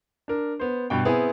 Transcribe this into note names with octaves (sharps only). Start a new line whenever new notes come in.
D4 A#4
B3 C5
G2 B2 G5
B3 C4 E4 G#4